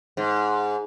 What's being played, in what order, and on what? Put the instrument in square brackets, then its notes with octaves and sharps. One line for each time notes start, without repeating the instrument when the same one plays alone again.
[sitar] G#2